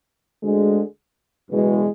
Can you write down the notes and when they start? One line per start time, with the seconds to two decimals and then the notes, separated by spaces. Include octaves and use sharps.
0.43 D2 D3 G#3
1.50 F#1 E2 B2 G#3